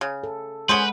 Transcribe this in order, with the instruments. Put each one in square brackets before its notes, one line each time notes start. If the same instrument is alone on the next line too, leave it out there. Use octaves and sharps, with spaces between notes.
[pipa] C#3
[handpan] A4
[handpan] G#3 F#5 [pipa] C#4 G#4 C5 [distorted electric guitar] B4